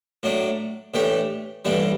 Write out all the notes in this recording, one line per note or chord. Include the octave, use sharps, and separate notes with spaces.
A2 F#3 A3 D4
A2 E3 A3 D4 G4
A1 G2 E3 G3 D4